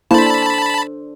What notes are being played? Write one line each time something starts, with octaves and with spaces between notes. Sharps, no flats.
A#3 D4 E4 A4 C5 A5 B5